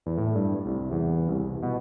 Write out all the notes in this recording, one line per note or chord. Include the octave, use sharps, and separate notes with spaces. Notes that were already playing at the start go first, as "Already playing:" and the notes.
E2
A2
G2
C2
E2
C2
B2